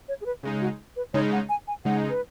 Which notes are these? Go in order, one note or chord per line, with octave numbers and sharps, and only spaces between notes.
C#5
G#4
B4
C#3 G#3 D#4 G#4
F#4
B4
C#3 G#3 D#4 C#5
F#5
G#5
G#5
C#3 G#3 D#4 F#5
B4